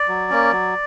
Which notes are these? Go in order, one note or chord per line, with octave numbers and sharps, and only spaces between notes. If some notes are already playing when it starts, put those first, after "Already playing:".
Already playing: D5
F#3
A#3 C#4
F#3